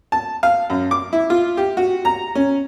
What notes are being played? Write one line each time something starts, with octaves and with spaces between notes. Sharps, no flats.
A5
F5
F#2
D6
E4
F4
G4
F#4
A#5
C#4